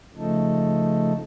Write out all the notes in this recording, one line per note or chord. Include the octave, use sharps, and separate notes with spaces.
C#3 F3 A3 D#4 A4